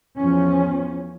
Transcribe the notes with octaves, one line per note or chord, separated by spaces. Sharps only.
E2 F3 C#4